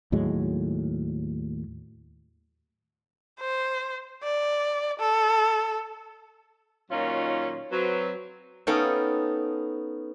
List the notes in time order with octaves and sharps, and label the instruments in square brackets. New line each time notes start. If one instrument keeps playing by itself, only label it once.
[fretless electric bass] D#2 A2 F#3 G#3
[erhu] C5
D5
A4
[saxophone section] A#2 D#3 F#3 C#4 D#4 F4
F#3 C4 B4
[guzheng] B3 C#4 D#4 A4 F5 G5